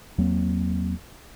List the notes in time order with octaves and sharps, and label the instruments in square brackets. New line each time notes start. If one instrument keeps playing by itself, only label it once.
[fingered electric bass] E2 F#3 A#3 C4